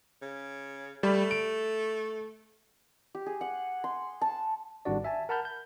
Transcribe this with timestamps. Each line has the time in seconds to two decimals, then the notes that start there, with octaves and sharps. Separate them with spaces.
0.22 C#3
1.03 G3 A3 B5
1.31 D7
3.15 G4
3.26 G#4
3.41 F#5
3.84 C6
4.21 A5
4.85 G#1 G3 D4 F#4 D5
5.04 E5 G#5 A5
5.29 A#4 F#5 A5 B5 F6 G6
5.45 G6